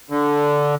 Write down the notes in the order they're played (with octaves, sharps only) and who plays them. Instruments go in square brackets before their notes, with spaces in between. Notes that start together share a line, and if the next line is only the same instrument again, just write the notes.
[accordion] D3